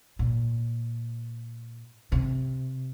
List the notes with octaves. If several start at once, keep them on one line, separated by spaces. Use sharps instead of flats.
A#2
C3